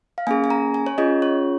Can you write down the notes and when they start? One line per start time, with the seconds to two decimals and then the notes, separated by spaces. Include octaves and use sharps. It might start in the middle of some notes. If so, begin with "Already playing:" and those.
0.18 F5
0.27 A#3 C#4 G#4 G#5
0.44 G#5
0.50 A#5
0.74 G#5
0.86 C#5
0.98 C#4 F4 G#4 D#5
1.22 C#5